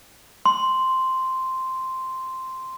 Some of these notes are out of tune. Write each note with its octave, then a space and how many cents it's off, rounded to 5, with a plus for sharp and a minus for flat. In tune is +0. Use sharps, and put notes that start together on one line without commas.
C6 -5